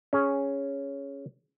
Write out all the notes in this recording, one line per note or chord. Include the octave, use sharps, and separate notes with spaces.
C#4 G#4